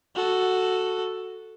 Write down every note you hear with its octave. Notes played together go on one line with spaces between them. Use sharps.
F#4 A4